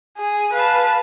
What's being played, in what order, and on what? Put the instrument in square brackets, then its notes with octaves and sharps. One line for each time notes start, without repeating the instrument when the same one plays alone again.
[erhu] G#4
[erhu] B4 [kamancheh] F5 A5